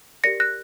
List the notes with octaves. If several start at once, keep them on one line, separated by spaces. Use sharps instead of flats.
G4 A#4 D5 A#6 C#7
F#6 A#6